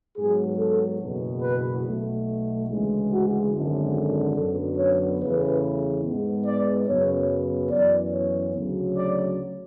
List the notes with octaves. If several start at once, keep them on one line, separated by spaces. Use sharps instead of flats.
G#2 F#3 B3 G#4
A4
F#1 E2 B2
B4
B1 B2 A3
D2 C#3 E3 G#3
F#4
G#1 F#2 D3
F#2 D3 F#3 B3 A4
C#5
E2 C#3 E3 A3 B4
G#2 G#3 B3
D5
F#2 C#3 F#3 B3 C#5
F#2 E3 B3 D5
C#5
D2 C#3 F#3
D5